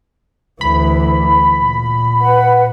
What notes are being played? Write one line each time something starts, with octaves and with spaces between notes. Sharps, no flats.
D2 E3 B5
A#2
B4 F#5